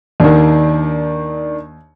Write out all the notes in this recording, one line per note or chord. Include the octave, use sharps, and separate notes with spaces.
D#2 D#3 D4